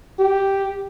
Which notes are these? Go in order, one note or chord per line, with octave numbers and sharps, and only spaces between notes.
G4